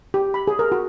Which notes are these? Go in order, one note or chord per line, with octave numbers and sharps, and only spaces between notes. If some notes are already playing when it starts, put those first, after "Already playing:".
G4
B5
G#4
A#4
F#4